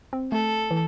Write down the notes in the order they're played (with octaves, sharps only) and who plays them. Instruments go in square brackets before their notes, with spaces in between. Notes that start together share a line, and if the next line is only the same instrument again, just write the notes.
[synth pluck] C4
[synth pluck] A3 [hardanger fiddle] A4
[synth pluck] E3